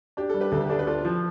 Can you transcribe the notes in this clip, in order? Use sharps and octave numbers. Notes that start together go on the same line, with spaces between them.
D4 G4
G3 A4
G4 B4
D2 A4
G4
D4 A4
G4 B4
F4 A4
F3